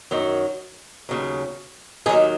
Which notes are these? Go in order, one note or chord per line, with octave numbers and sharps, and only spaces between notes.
F#2 D#3 F#3
D#2 C#3 F#3
D#2 D#3 F#3 D#4 G#4